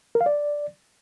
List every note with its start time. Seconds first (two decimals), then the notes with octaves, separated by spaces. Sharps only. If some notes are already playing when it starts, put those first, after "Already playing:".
0.15 A#4
0.21 F5
0.26 D5